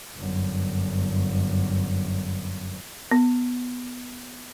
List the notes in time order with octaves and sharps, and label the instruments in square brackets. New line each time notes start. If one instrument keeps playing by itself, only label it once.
[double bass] G1 F#2
[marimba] B3